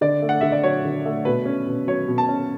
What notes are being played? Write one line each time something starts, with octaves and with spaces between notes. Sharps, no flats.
D3 D5
A3
F#5
D3 E5
D5
F#3 C#5
D3
A3
B2 B4
C#4
B2
F#3 C#5
B2
A5
C#4